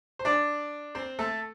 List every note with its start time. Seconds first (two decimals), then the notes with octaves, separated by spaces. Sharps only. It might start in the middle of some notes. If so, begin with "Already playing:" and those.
0.19 C5
0.25 D4 D5
0.95 C4 C5
1.19 A3 A4